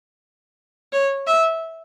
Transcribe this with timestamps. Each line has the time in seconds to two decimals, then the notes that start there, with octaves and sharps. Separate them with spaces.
0.93 C#5
1.27 E5